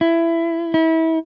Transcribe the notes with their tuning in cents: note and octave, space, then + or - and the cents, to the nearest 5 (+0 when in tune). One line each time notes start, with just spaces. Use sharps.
E4 +20
E4 -30